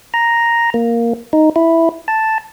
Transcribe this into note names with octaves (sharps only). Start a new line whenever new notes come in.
A#5
A#3
D#4
E4
A5